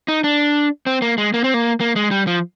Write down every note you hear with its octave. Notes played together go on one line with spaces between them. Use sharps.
D#4
D4
C4
A#3
G#3
A#3
C4
A#3
A#3
G#3
G3
F3